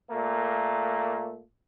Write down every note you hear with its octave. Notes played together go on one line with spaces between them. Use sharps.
A#2 A3 A#3